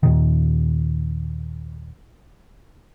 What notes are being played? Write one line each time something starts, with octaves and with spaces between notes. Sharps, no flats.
D#2 A#2 D#3